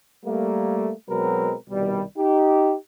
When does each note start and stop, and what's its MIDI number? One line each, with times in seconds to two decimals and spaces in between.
0.25 0.92 55
0.25 0.92 57
0.25 0.92 58
1.09 1.54 47
1.09 1.54 54
1.09 1.54 56
1.09 1.54 60
1.09 1.54 70
1.09 1.54 71
1.69 2.02 36
1.69 2.02 47
1.69 2.02 51
1.69 2.02 55
2.17 2.75 63
2.17 2.75 67